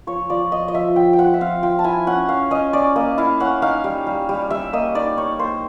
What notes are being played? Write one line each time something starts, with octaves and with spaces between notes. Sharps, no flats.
F3 C#5
F3 D5
F3 D#5
D#5
F3 E5
F3 G5
G5
F3 F#5
E5
C4 F5
F3 G5
A5
E4 G#5
C#4 F#5
C#4 F5
C#4 D#5
C#4 D5
A#3 D#5
E4 F5
C#4 F#5
D#4 F5
G3
G3
G3
G3 E5
A#3 D#5
D#4 D5
D#4 C#5
A#3 C5